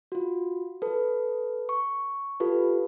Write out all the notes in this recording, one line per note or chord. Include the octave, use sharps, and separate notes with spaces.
F4 F#4
A4 B4
C#6
F4 G4 A4 B4